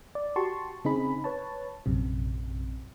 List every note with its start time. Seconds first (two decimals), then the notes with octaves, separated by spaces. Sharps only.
0.15 D5
0.36 F#4 G4 A5 C6 C#6
0.85 C#3 C4 D#4 G#4 B5
1.24 B4 C#5 A5
1.86 A#1 F#2 C3